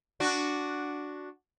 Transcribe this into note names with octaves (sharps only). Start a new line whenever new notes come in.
D4 F#4